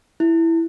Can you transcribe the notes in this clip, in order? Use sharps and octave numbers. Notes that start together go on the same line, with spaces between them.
E4